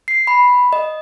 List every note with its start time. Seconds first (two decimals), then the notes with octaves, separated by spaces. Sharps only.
0.08 C7
0.27 B5
0.73 D#5